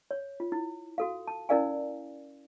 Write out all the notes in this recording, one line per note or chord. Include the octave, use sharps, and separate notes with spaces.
C#5
F4
E4
F#4 A4 F5
A5
C#4 E4 A#4 D5 F5 G#5